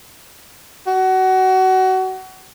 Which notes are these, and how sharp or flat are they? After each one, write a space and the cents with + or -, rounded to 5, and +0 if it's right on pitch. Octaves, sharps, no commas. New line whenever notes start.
F#4 +25